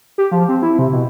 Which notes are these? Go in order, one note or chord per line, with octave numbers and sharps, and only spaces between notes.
G4
F3
C4
E4
C3
B2